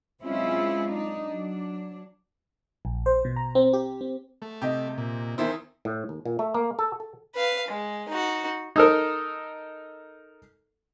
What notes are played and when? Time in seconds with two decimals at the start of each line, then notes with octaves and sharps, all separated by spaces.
0.23 F#3 G#3 C4 C#4 E4 F4
0.90 D4 D#4
1.27 F#3 D4
2.85 A#1
3.06 C5
3.25 B2
3.36 A#5
3.55 C4
3.73 G4
4.01 C4
4.42 A3
4.62 C3 G4 D#5
4.98 A#2
5.38 E2 D#3 E4 C5
5.85 A2
6.09 D#2
6.26 A#2
6.39 A3
6.54 A#3
6.79 A4
7.00 A4
7.35 B4 F5
7.68 G#3
8.09 D#4 F#4
8.76 D#4 A4 A#4